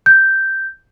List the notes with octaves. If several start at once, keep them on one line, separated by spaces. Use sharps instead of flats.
G6